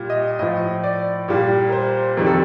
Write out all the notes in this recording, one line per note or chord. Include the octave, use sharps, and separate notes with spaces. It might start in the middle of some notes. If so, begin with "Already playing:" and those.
Already playing: A#2 G3
D#5
A2 F3 D#5
D5
A#2 G3
A#4
C5
F2 D#3 G3 A#4
A4